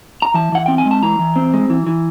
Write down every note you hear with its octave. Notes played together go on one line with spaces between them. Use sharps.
A#5
E3 A5
E3 F#5
C4 G5
G#5
G#3
A5
E3 A#5
E3
C4
G#3
E3
E3